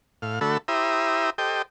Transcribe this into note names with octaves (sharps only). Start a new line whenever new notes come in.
A2 F5
D3 A3 F#4 A4 B5 E6
E4 G4 C5 E5 A#5 D#6
G4 A4 C5 D#5 G5